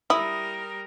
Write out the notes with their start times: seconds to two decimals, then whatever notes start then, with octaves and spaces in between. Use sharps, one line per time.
0.10 G3 E4 A#4 D#6